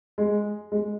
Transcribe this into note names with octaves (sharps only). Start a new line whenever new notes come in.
G#3
G#3